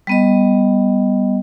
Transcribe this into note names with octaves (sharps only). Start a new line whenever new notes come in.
G3 B3 D#5